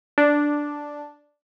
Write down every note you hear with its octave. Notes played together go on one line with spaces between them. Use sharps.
D4